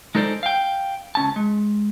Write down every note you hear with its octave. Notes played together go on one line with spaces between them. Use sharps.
G#3 D#4 A4 C5 D5
F5 G5
C#2 C#4 A5
G#3